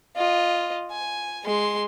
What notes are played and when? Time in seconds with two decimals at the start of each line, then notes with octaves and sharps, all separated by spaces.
0.16 F4 D#5
0.91 G#5
1.45 G#3 C6